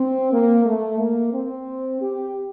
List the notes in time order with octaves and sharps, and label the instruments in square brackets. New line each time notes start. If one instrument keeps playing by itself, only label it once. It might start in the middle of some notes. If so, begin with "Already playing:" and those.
Already playing: [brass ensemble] C4
A#3
A3
A#3
C4
G4